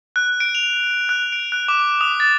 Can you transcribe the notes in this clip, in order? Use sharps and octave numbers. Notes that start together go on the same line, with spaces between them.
F#6
D7
F7
F#6
D7
F#6
D6
D#6
A6